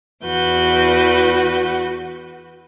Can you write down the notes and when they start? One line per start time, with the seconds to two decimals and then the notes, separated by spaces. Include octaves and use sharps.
0.24 E2 F#4 B4 G6